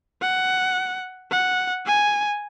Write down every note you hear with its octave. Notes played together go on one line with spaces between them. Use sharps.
F#5
F#5
G#5